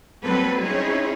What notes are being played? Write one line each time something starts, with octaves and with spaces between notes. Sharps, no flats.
F#3 G3 A#3 C4 A4 B4
C4 C#4 D#4 E4 G#4 C#5